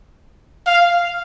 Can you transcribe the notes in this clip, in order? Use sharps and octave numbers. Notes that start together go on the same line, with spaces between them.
F5